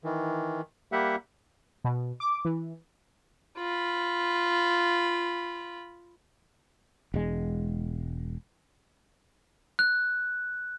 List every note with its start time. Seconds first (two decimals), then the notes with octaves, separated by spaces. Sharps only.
0.04 D#3 E3
0.92 G3 A#3 G4 E5 F#5
1.84 B2
2.20 D6
2.45 E3
3.58 F4 B5
7.14 E1 G#3
9.79 F#6